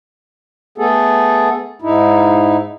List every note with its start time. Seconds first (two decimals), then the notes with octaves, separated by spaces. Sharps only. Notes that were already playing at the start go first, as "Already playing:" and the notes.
0.78 A3 B3 G#4 A4
1.82 G#2 D#4 E4